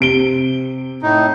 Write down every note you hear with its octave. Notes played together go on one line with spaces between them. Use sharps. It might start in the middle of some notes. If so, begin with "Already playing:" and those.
C3 D7 G7
A2 D#4